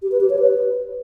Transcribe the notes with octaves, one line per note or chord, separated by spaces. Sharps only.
G4
B4
G4
C#5
B4